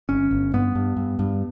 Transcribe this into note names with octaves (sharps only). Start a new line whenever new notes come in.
G1 C#4
G1
G2 B3
G2
G2
G2